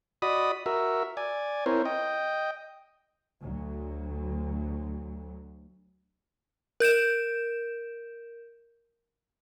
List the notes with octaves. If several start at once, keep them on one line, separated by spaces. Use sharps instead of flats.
F#4 D5 D#5 B5 D#6
F#4 A#4 E5
D5 G#5
C4 E4 A#4 C5 C#5
D#5 G5
D2 F#3
A#4 G6 D7 E7